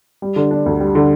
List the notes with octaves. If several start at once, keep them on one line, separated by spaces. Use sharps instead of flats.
G3
D3
D4
D2
G3
D3